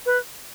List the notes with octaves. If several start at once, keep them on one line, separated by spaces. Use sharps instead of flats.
B4